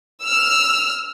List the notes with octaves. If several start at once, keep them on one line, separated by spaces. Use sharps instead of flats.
E6 F6